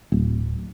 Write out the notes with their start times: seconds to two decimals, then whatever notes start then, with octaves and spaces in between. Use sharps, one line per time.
0.12 D1